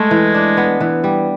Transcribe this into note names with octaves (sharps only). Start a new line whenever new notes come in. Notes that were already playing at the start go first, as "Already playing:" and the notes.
Already playing: G#3 A3
E3
D4
B3
E3
G3